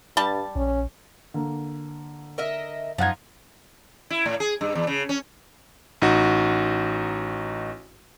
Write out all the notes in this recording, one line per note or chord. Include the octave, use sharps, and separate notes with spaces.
G2 G3 A5
A#1 C#4
D3 A#3
A#4 D#5 E5
F#2 F3 D#4 F#5 G#6
E4
A2
G#4
G2
E2
C#3
C#4
A1 D#4 F#4